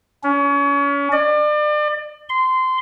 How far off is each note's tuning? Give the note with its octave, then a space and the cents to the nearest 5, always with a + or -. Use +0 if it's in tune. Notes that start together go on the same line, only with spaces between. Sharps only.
C#4 +35
D5 +35
C6 -20